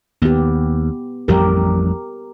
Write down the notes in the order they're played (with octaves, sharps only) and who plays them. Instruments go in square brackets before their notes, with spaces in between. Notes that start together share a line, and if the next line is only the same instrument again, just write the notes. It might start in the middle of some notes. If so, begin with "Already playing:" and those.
[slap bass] D#2 [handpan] B3 G4
[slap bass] A1 F2 G3 [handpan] G4 A#4